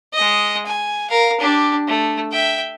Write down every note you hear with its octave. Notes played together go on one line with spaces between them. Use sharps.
G#3 D#5
G#5
A#4 F5
D4 G4
A3
E5 G5